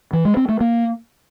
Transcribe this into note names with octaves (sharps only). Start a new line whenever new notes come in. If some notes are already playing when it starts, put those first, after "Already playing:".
E3
G#3
C4
A3
A#3